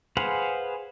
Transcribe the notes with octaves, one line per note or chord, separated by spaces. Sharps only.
G#4 B4 C5 F5 F#5